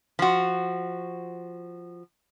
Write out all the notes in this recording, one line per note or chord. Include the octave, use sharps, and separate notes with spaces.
F3 F#4